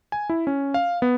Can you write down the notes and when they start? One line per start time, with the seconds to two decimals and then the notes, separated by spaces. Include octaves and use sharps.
0.12 G#5
0.29 E4
0.47 C#4
0.74 F5
1.02 B3